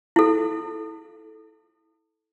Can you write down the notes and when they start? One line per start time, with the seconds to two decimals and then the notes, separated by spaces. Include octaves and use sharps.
0.16 E4 A4